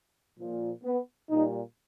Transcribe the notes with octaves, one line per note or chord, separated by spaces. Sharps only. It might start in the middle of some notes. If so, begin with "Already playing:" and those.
A#2 F3
B3
A#2 G3 D#4